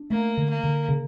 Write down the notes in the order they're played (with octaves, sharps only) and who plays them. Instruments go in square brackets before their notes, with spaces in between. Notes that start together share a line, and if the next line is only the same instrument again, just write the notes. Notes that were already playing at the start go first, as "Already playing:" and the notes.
Already playing: [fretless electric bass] D4
[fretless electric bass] A3 [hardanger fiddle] A#3
[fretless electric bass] D3
[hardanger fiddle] A#3
[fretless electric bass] D3
C#3